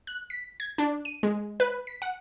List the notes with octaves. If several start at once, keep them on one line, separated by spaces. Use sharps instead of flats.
F#6
B6
G#6
D4
D#7
G#3
B4
B6
F#5